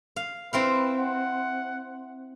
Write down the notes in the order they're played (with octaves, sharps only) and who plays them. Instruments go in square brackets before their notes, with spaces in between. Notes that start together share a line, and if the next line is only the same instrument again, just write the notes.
[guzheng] F5
[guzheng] C4 E4 F5 [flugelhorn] B4
[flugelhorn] F#5